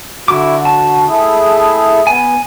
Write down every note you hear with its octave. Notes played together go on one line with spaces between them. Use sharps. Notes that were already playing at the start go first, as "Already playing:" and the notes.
D3 E4 F#4 D6
A5
A3 E4 G#4
B3 G#5